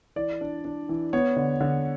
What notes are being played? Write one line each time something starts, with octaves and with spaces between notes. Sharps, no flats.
E3 D5
D4
D4
E3
B3 C#5
D3
D3